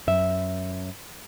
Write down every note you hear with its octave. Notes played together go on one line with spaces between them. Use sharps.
F#2 E5